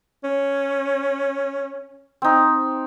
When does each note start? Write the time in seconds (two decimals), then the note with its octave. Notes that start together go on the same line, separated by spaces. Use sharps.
0.24 C#4
2.22 C4 D#4